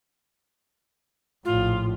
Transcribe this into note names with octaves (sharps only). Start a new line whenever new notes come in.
A#1 A2 F4